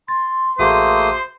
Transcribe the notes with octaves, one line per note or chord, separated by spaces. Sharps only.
C6 A6
A1 A3 A#3 F#4 G#4 C5 D#6